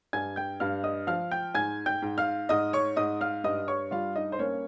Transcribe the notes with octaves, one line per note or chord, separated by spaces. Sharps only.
G2 G#5 G#6
G5 G6
G2 F5 F6
D#5 D#6
F3 F5 F6
G5 G6
G#2 G#5 G#6
G5 G6
G#2
F5 F6
G#2 D#5 D#6
C#5 C#6
G#2 D#5 D#6
F5 F6
G2 D#5 D#6
C#5 C#6
G3 F4 F5
D#4 D#5
C5
A#3 C#4 C#5